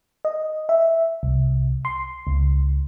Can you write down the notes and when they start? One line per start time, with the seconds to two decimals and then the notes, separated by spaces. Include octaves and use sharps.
0.25 D#5
0.69 E5
1.23 C2
1.85 C6
2.27 C#2